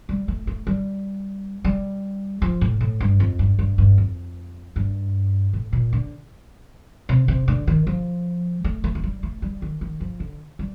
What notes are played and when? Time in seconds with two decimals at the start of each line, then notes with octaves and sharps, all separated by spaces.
0.09 G3
0.28 A3
0.47 A3
0.67 G3
1.65 G3
2.42 F3
2.61 A2
2.81 A2
3.00 G2
3.20 F2
3.39 G2
3.59 G2
3.78 G2
3.98 F2
4.76 G2
5.53 A2
5.73 A#2
5.93 D3
7.09 C3
7.28 C3
7.48 D3
7.67 D#3
7.87 F3
8.64 A3
8.84 A3
8.95 A3
9.03 G3
9.23 A3
9.42 G3
9.62 D#3
9.81 D#3
10.00 F3
10.20 D3
10.59 G3